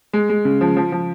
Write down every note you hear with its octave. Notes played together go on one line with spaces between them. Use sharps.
G#3
G#3
C#3
F3
F3
F3